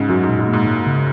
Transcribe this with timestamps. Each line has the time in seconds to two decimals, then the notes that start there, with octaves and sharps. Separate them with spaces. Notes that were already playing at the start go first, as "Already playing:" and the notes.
Already playing: G#2 C#3 C#4
0.09 F#2 F#3
0.23 G#2
0.29 A#2
0.38 G#2
0.48 G#2 A#3
0.67 G#3
0.86 C#3